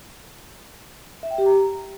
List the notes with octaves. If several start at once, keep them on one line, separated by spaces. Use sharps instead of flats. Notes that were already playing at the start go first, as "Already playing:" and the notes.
E5
G5
G4
A#5